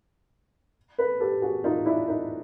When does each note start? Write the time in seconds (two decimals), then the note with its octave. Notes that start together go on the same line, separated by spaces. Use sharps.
0.98 A4 B4
1.20 G4 A4
1.42 F#4 G#4
1.64 D#4 F4
1.86 D4 E4
2.08 D#4